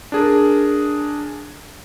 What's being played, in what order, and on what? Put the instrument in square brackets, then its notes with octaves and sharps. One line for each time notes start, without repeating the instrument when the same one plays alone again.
[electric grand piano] D4 G#4 A#4